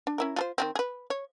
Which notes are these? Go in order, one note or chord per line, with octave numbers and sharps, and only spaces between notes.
D4
C#4 E4 A#4
F4 A4 C5
D#3 G3 C4
G#4 B4
C#5